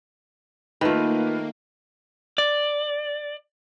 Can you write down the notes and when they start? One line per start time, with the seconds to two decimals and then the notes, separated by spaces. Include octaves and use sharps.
0.81 D#3 A3 A#3 F4 B4
2.38 D5